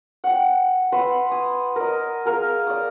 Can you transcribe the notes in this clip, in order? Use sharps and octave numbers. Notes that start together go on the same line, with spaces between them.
F#5 G5
B4 E5 F#5 C6
G#5 D#6
A#4 D#5
G#4 A#4 F5
D5 D#6